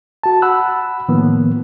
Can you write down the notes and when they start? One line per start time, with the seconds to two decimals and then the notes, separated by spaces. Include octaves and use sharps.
0.23 F#4 A5
0.42 F#5 B5 E6 F#6
1.08 A2 D#3 F3 A#3 B3